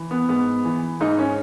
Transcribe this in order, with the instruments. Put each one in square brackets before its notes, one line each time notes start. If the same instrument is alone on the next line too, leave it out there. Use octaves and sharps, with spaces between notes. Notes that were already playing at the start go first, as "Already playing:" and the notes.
Already playing: [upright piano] E3
B3
G#2 B3
E3
G#2 D#4
C#4